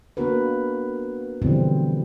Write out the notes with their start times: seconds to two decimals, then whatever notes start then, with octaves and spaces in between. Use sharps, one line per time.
0.17 A#3 B3 D4 F#4 A#4 B4
1.42 B2 D3 E3 F3 G3 C4